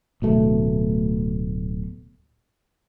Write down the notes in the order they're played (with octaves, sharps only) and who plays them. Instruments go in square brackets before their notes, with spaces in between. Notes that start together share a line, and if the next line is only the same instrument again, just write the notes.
[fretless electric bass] D1 B2 A3